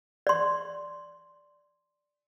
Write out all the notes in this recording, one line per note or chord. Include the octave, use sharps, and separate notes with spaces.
D5 C6